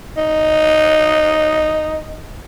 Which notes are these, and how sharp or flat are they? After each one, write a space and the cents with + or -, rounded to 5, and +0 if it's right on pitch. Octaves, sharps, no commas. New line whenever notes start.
D#4 -5